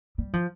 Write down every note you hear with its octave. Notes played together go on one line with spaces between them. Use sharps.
G3
F3